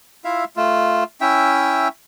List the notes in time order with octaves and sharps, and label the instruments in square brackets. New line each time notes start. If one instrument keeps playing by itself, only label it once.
[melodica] E4 F4 E5 F5
A3 F4
C#4 E4 E5 G5